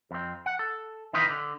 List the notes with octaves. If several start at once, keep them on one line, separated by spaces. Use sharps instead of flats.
F2 C4
F#5
A4
D#3 E3 D#4 F4 B4 D#5
D3